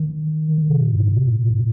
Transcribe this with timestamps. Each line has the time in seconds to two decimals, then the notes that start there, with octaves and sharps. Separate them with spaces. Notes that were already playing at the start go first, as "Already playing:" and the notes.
Already playing: D#3
0.58 D#3
0.70 C3
0.81 A#2
0.93 G2
1.04 A2
1.16 C3
1.27 A#2
1.38 A2
1.50 A#2